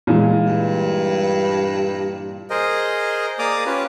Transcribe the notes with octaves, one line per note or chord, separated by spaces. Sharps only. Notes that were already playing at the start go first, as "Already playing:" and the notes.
A#2 E3 G#3
G2
G#4 A#4 C5 D#5
A#3 G#4 D5 A#5 D6 D#6
C#4 F4 G4 B4